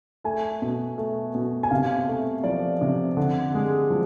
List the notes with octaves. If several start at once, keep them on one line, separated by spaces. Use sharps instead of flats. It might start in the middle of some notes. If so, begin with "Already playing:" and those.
A3 G#5
B2
A3
B2
G#5
C3 F5
A3
F3 D5
C3
D3
G#3
F3